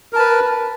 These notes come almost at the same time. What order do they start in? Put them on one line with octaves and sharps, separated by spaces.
A#4 A5 B4